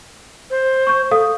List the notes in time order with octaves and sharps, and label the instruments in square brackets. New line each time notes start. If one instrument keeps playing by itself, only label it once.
[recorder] C5
[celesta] C#6 G6
A4 F5 D#6